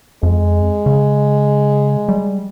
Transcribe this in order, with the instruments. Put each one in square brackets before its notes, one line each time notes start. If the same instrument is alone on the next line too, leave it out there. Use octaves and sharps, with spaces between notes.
[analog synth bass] F2 [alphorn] G#3
[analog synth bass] C#3
G3